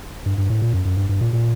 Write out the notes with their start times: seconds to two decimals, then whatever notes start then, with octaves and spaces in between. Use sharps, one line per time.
0.26 G2
0.38 G2
0.50 A2
0.62 A#2
0.73 F#2
0.85 F#2
0.97 G2
1.09 G2
1.21 A#2
1.33 A#2